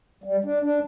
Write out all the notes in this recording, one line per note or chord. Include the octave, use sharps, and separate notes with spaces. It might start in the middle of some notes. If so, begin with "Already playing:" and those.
G3
D4
D4